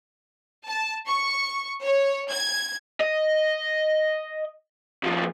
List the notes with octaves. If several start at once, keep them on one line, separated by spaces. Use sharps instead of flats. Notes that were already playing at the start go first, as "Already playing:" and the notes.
A5
C#6
C#5
G#6
D#5
D#2 F3